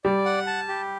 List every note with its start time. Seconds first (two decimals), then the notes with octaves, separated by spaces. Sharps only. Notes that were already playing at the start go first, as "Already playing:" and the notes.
0.04 G3 D5
0.25 F#5
0.47 A5
0.68 G4